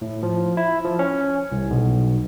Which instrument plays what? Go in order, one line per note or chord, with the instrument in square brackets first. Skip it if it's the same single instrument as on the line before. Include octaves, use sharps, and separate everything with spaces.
[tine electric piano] A2
F3
E4
F3
C#4
C2
B1